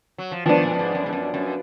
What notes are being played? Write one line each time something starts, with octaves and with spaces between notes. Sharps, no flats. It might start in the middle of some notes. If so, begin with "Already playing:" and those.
F#3
F3
D#3 F3 B3 D4
A#2
F#2
G#2
F#2
G#2
F#2
F#2